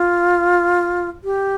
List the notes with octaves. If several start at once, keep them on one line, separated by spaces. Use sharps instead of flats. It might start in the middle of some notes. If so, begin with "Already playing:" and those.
Already playing: F4
G4